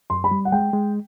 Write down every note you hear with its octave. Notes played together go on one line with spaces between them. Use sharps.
F#2 C6
B5
G3
F#5
G#3 G5
G#3